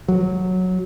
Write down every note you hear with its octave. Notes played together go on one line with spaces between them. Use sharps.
F#3